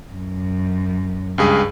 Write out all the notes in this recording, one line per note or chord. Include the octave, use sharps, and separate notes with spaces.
F#2
C#2 G2 G#4